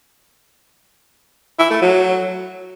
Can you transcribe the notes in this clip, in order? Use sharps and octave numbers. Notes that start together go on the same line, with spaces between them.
E4
A3
F#3